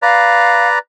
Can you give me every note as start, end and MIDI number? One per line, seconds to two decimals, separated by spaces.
0.02 0.79 71
0.02 0.79 74
0.02 0.68 77
0.02 0.79 82